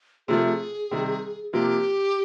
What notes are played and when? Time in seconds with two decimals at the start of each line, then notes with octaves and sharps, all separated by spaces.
0.28 C3 F3 A3 G#4
0.91 C3 D#3 G3
1.53 C3 F3 A#3 G4